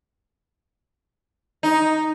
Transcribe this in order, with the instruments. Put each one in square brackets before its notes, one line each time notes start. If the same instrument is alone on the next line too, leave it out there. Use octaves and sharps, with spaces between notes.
[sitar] D#4